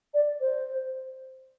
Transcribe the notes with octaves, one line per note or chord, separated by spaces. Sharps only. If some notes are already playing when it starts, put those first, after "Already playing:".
D5
C5